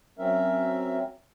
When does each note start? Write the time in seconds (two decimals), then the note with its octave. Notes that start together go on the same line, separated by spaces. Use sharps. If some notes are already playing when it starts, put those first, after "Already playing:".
0.19 F#3 C4 C#4 A#4 E5